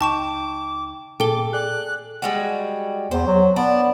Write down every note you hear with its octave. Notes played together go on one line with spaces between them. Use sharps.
C#2 D#4 G5 A5 C#6 D6 E7
A#2 G#4 A4 G5 D6 G7
G#4 D5 F#6
G3 G#3 F#4
E2 C5
F#3
B3 D4